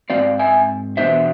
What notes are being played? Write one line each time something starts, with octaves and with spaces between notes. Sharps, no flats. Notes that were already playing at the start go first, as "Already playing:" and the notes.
G#2 G#3 C4 D5 F5
E5 G#5
E2 B2 B3 D4 C5 E5